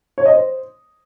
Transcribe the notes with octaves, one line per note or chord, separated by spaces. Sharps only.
C#5
D#5
C5